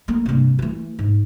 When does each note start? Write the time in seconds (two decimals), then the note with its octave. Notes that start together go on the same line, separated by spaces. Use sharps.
0.08 A3 A#3
0.26 G2 C3
0.59 E3 A3
0.99 G#2